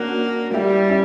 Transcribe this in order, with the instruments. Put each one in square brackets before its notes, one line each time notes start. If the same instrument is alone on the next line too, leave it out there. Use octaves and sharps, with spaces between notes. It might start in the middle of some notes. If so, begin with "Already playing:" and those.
Already playing: [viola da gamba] A#3 [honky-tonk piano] C#4 D4 F#4
[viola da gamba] G3 [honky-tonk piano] E4 G4
[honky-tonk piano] C#4 E4